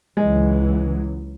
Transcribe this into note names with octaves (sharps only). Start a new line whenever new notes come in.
C#2 E3 F#3 G#3